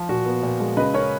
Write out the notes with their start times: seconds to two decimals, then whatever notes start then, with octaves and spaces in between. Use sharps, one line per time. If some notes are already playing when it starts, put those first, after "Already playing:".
Already playing: F3
0.09 A#2 F#4
0.26 B3
0.43 A#2
0.60 G#3
0.77 C#3 B4 D#5
0.94 C#4 A#4 C#5